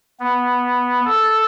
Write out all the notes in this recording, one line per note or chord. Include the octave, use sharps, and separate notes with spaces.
B3
A4